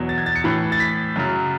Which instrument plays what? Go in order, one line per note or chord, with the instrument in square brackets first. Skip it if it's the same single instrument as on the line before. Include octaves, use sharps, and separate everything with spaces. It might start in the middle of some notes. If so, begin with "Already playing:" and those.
Already playing: [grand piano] E2 B2 F#3
A6
G#6
A6
C#7
A2 E3
A6
B6
F#2 C#3 F#3